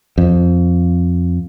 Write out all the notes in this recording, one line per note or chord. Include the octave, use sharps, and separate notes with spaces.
F2